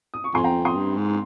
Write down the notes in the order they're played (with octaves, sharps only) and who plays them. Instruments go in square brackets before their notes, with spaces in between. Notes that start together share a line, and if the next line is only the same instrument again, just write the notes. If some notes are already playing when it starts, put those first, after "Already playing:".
[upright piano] D#6
C#6
[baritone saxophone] F2 [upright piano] G#5 C6
[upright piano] G5 A#5
C6 D#6
[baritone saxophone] G2
G#2